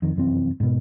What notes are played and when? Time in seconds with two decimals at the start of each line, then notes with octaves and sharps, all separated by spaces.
0.02 F2 D#3
0.16 F1 F#2 E3 C4
0.60 G#2 B2